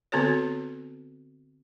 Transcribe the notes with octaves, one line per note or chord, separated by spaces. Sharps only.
D3 B3 C4 F#4 A4 C#5